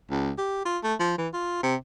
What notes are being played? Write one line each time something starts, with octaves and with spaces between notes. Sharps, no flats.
C#2
G4
F4
A3
F3
E3
F4
C3